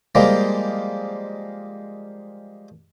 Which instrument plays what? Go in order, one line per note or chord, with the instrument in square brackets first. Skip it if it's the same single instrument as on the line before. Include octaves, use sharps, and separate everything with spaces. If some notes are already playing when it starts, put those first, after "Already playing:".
[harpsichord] F3 G3 G#3 A#3